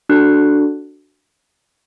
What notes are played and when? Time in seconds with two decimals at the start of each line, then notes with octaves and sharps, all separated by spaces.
0.09 D4 F#4 A4 F#6